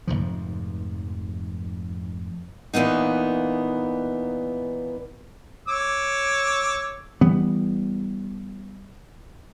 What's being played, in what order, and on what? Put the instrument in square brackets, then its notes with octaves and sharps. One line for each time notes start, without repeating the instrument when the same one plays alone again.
[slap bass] F1 B1 G#2 F3
[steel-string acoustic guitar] A#2 E3 A#3 B3 D#4
[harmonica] C#5 D6 E6
[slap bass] E3 G3 B3